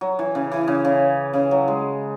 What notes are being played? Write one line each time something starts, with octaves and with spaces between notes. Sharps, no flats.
F#3
E3
C#3
E3
C#3
C#3
C#3
F#3
G#3